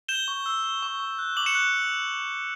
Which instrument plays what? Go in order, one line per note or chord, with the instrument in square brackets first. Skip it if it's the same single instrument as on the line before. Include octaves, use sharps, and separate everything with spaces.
[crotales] G6 E7 G7
C#6
E6
E6
C#6
C#6
F#6
D6 F#7
C#7 E7
F#6